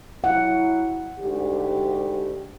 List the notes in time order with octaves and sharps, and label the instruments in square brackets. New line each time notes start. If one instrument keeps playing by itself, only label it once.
[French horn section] F#3 E4 [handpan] F#5
[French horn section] D2 G#2 G4